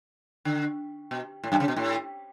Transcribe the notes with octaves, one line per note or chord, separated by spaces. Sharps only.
D3
B2
A2
F#2
C#3
B2
A2